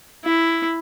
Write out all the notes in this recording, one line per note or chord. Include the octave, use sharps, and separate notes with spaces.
E4